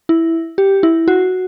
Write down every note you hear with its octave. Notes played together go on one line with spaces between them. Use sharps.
E4
G4
E4
F#4